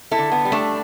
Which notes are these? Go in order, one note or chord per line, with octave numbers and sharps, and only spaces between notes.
E4 A4
D3
B3
G3
A3 D4